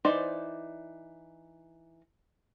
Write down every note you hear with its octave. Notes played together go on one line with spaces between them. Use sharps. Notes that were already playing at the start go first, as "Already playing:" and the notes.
E3 D#4 C5 D5